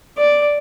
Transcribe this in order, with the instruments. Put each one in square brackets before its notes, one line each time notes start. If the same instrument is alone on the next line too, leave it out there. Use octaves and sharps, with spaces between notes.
[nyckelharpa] D5